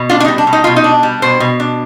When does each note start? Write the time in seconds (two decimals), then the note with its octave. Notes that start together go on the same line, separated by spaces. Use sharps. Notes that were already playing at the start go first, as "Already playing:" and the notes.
Already playing: B2
0.10 D4 F4
0.20 D4
0.25 D#4
0.28 G3
0.38 D4
0.47 B2
0.53 D#4
0.64 B2 F4
0.76 D#4
0.84 D4
1.03 G3
1.22 B2 C5
1.40 B2
1.60 D4